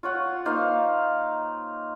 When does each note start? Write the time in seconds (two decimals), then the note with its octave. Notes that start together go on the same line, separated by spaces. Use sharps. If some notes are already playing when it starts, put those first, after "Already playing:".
0.03 F4 C#5 F#5
0.45 A#3 D#4 C5 F5